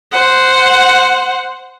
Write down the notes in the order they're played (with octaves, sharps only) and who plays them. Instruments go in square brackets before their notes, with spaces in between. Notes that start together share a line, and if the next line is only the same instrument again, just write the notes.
[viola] C5 F#5